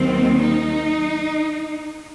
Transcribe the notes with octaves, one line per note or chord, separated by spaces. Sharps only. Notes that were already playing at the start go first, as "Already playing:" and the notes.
Already playing: D#2 D#3 F#3 C4
D#4